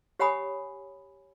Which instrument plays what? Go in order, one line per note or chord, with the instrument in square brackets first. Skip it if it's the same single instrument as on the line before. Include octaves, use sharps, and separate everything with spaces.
[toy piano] G4 C#5 F#5 G#5 B5 D#6